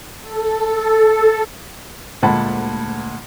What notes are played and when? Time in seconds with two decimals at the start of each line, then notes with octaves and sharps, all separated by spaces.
0.20 A4
2.23 D2 A#2 G#3 F#5 A5 B5